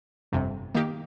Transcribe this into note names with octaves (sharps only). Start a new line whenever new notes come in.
G1 F2 C3
D#3 A#3 D#4 G4